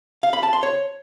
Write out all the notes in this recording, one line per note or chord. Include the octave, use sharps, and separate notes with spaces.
F5
B5
A5
C6
C#5